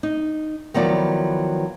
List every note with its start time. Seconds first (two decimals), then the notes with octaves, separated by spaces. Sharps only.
0.03 D#4
0.74 D#3 F3 F#3 B3 E4 D5